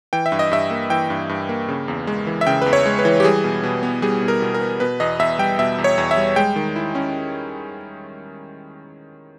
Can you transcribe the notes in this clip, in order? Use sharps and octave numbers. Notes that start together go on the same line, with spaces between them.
E3 G5
E5
G2
D#5
G2 E5
A#3
E3 G5
G2
G2
A#3
C#3
E2
G#3
E3
E5
C#3 G5
E2 B4
C#5
G#3
B4
E3
G4
G3 G#4
B2
B2
B3
G3 G#4
B2
A#4
B2
A#4
B3
B2 B4
E2 D#5
E2 E5
G3 G5
B2 E5
E2
C#5
E2
E5
G3
G#3 G5
D#3
E4
C#4